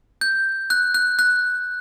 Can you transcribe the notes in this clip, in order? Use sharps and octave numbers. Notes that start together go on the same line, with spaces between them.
G6
F#6
F#6
F#6